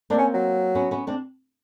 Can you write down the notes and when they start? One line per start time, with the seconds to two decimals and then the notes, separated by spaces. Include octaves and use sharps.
0.10 A#3 C4 D4
0.18 C#4
0.34 F#3
0.75 B3 C#4
0.91 B3 C#4
1.07 C4 D4